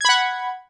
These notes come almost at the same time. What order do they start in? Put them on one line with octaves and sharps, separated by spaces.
G#6 B5 F#5